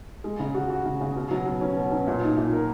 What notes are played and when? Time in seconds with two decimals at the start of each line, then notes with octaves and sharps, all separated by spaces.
0.24 G#3
0.39 C#3
0.55 F#4
0.70 F#4
0.85 C#3
1.01 C#3
1.16 B2
1.31 F#3
1.45 B2
1.61 C#4
1.76 B2
1.91 C#4
2.07 A#2
2.22 D#4
2.37 A#2
2.53 A#4